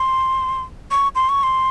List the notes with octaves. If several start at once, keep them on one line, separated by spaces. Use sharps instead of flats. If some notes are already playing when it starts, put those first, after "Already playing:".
Already playing: C6
C#6
C6
C#6
C6